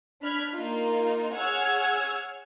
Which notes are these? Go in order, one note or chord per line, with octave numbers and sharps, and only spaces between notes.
D4 B5 F6 G#6 B6
A#3 D#4 F4
G#4 C#5 F#5 E6 F6 G#6